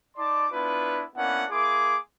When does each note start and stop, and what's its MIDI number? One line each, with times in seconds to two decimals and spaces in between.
0.17 0.47 63
0.17 0.47 74
0.17 0.47 81
0.17 0.47 84
0.17 0.47 86
0.51 1.03 59
0.51 1.03 62
0.51 1.03 64
0.51 1.03 65
0.51 1.03 71
1.16 1.44 58
1.16 1.44 59
1.16 1.44 61
1.16 1.44 62
1.16 1.44 64
1.16 1.44 78
1.50 1.97 58
1.50 1.97 64
1.50 1.97 68
1.50 1.97 84
1.50 1.97 86